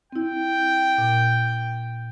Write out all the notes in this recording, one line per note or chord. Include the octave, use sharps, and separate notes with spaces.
C4 E4 G5
A#2